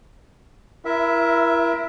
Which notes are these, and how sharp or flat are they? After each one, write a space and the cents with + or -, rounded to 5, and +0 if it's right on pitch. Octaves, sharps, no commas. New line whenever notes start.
E4 +30 A#4 +30 E5 +0